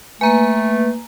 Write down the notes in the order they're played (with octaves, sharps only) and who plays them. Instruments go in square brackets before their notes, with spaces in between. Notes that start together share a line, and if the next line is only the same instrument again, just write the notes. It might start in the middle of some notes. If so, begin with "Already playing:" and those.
[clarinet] A3 [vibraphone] A#3 B4 [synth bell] G#5 A#5